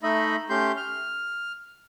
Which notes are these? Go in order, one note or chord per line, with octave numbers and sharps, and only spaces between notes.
A3 D#4 D#5 E5 B5
A3 C#4 G4 C6 G6
F6